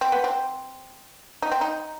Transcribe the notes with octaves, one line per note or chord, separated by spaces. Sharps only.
C4
B3
C4
D#4
C4
D#4